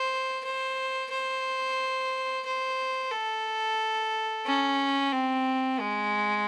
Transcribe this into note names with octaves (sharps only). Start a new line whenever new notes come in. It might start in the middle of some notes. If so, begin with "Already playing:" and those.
Already playing: C5
C5
C5
C5
A4
C#4
C4
G#3